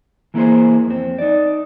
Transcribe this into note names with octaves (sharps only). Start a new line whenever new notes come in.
E3 A#3 E4 G#4 C5
F2 C4
D#4 D5